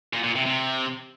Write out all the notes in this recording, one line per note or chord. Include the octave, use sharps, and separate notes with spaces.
A#2
A#2
C3
C3